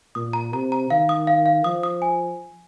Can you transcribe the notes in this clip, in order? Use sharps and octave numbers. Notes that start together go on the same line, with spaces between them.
A#2 D#6
A#5
C3 A#5
A#5
D#3 F5
D#6
F5
F5
F3 D#6
D#6
G#5